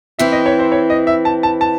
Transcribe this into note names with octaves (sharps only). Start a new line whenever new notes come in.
E3 C4 E4 E5
D#5
C#5
C5
C#5
D#5
E5
A5
A5
A5